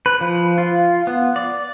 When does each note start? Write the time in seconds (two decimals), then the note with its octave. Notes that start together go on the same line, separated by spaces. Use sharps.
0.06 B4
0.21 F3
0.58 F4
1.07 B3
1.36 D5